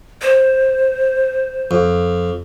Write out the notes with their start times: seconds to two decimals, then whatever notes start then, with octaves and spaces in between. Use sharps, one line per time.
0.22 C5
1.71 F2